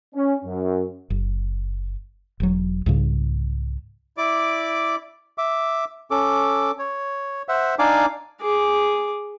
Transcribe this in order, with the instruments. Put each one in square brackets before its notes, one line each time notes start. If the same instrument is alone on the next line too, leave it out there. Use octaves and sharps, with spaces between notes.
[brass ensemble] C#4
F#2
[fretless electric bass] F#1
E1 F#3
C2 G#2 C#3
[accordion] E4 D5 D6
[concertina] E5 D6
C#4 A4 D6
C#5
C5 E5 F#5
D4 D#4 D5 F5 G#5 D6
[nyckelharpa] G#4 D6